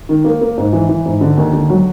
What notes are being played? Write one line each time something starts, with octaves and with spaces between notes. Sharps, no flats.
D#3
A#3
A#3
G#2
E3
E3
G#2
D3
D#2
D3
F#3